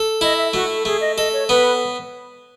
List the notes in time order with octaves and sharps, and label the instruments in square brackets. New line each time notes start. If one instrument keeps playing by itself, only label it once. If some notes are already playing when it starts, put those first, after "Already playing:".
Already playing: [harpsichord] A4
[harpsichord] E4 [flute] D#5
[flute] E5
[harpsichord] A3 [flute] F#4
[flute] A4
[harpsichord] A3 [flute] G#4
[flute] D#5
[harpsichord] A4 [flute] D#5
[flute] C#5
[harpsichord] B3 [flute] B4